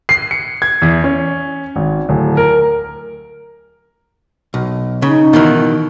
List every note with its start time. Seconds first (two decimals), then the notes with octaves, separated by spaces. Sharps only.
0.09 C7
0.31 C#7
0.62 G#6
0.82 E2
1.04 C#4
1.76 G#1
2.09 D1
2.37 A#4
4.54 B1
5.02 C#3 D#4
5.33 B2 D#3 E3